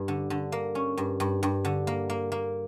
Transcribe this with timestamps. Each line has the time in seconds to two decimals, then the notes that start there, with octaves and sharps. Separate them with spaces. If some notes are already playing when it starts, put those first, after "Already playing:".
Already playing: G2
0.08 D3
0.30 D3
0.52 A#3
0.75 C#4
0.98 G2
1.20 G2
1.43 G2
1.65 D3
1.87 A#3
2.10 A#3
2.32 A#3